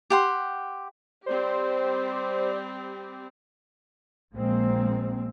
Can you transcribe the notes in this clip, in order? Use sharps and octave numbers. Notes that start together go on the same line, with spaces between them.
G4 F#5 C6
G3 C4 G4 C5 D5
A#1 G#3 A#3 C4